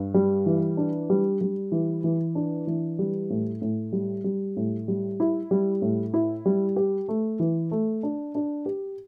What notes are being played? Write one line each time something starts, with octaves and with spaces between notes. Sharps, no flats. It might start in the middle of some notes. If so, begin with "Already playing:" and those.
Already playing: G2
G3
E3
D4
G3
G3
E3
E3
D4
E3
G3
A2
A2
G3
G3
A2
G3
E4
G3
A2
E4
G3
G4
A3
E3
A3
D4
D4
G4